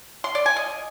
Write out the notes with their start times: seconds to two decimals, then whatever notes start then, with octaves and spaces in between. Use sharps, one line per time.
0.24 C6
0.35 D5
0.46 G#5
0.56 D#5